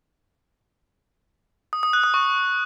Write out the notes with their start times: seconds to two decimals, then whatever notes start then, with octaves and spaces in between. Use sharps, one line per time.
1.73 D#6
1.83 D#6
1.93 F#6
2.04 D#6
2.14 C#6